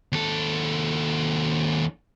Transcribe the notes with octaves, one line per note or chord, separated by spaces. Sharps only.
D#2 A4